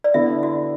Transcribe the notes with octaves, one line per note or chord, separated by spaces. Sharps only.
D5
D3 B3 E4 E5
F#4